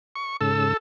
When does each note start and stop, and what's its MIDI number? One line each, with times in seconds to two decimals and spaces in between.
0.16 0.37 85
0.41 0.74 44
0.41 0.74 49
0.41 0.77 69
0.41 0.74 88